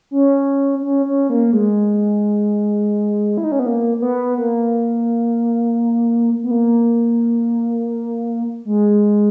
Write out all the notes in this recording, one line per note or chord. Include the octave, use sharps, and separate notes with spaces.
C#4
C#4
C#4
A#3
G#3
E4
D#4
C#4
B3
A#3
A#3
B3
A#3
B3
A#3
G#3